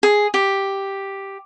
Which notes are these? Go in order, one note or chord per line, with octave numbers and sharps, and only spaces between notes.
G#4
G4